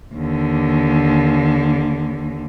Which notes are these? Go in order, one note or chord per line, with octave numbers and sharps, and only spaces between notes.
D#2 D3